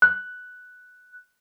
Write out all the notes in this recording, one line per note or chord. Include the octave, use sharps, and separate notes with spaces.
F#6